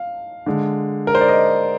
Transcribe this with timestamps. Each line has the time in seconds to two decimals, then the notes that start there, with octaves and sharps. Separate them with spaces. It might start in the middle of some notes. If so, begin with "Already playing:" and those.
Already playing: F5
0.46 D3 G#3
1.07 A#4
1.15 C5
1.21 D5
1.28 D#5